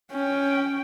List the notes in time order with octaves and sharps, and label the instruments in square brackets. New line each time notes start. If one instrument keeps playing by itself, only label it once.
[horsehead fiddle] C#4 G5